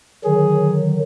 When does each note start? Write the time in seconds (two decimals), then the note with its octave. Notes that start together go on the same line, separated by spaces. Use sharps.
0.24 D3 D#3 F#3 G#4